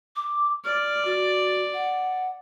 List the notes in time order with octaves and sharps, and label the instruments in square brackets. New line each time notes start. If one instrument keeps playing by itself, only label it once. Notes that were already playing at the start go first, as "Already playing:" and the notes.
[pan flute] D6
[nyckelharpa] D5 [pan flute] F6
[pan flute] F#4
F#5